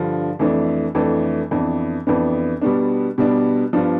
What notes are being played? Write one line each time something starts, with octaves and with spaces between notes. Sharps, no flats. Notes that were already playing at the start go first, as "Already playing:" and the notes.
Already playing: G2 D3 F3
F2 E3 A3 D4
F2 E3 A3 D4
F2 E3 B3 D4
F2 E3 B3 D4
B2 G3 B3 D4
B2 G3 B3 D4
G2 F3 B3 D4